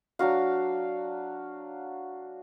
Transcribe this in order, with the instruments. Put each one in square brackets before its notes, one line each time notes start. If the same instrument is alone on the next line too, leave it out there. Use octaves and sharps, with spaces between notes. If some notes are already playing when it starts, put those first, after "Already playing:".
[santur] F#3 D4 F#4 F5